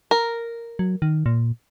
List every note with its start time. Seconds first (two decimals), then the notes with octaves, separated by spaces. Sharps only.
0.11 A#4
0.79 F#3
1.02 D#3
1.26 A#2